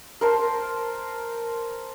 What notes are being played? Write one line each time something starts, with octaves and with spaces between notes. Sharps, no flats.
A#4 C5 A5